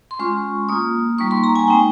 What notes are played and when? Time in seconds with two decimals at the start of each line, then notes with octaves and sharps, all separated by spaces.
0.11 C6
0.19 G#3 C#4 F4 C#6
0.69 A#3 F4 D#6
1.18 G3 A#3 D#4 C#6
1.31 C6
1.44 A#5
1.56 G#5
1.68 G#3 C4 D#4 G5